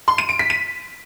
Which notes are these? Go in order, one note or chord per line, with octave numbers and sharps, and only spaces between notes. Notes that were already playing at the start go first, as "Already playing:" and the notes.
C6
D#7
D7
B6
D#7